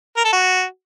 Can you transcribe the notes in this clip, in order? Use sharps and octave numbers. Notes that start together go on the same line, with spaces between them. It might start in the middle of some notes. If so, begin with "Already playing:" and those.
A#4
A4
F#4